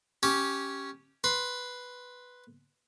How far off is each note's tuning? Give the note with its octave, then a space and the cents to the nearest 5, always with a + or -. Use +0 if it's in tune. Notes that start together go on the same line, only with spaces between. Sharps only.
C#4 +0 G4 -10
B4 +0 C6 +0